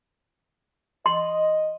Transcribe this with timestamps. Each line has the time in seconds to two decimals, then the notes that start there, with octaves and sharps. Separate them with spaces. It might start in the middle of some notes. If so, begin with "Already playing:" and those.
1.06 D#5 C6